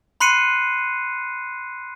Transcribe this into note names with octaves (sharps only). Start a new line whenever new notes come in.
B5 C6 F#6 C7 C#7 D#7